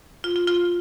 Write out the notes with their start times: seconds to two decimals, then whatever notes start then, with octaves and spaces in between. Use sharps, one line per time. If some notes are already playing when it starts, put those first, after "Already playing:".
0.24 F4
0.36 F4
0.47 F4